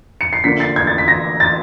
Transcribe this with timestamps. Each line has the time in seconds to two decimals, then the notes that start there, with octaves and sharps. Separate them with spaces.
0.21 C#7
0.33 C7
0.44 D3 F3 A#3 B6
0.60 A6
0.76 G#6
0.87 A6
0.98 B6
1.08 A#6
1.40 A6